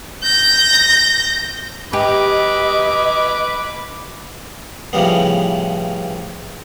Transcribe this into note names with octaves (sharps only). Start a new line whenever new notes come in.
G6 A#6
G4 B4 D#5 D6
A2 C#3 F3 G3 B3